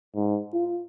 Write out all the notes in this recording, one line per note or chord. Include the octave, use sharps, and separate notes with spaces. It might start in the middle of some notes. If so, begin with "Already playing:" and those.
G#2
F4